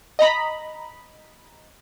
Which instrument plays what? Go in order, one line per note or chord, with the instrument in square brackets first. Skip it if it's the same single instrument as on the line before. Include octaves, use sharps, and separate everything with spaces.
[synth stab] D#5 A#5 B5